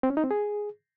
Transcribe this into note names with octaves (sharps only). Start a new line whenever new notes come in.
C4
C#4
D#4
C4
G#4